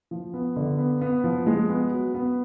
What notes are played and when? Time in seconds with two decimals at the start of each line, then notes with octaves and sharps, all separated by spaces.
0.11 F3
0.34 B3
0.56 D3
0.78 B3
1.01 B3
1.24 F3
1.47 G#3
1.69 B3
1.92 F#3
2.14 B3